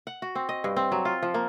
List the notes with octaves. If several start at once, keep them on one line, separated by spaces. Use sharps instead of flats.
F#5
F#4
C4
D#5
G2
C4
F#3
F4
F3
A#3